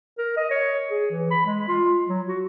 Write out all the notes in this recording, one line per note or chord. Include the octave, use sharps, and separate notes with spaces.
A#4
D#5
C#5
G#4
E3
B5
G#3
F4
F#3
F#4